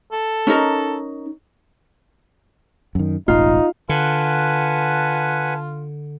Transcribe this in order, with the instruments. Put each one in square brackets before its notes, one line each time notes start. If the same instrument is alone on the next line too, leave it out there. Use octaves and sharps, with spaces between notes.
[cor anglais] A4
[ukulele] C#4 D#4 A#4
[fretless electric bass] F#2 D#3
[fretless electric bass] E1 A1 [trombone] D#4 [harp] F4
[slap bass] D3 [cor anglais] F4 [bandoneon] B4 F#5 G#5 [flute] A5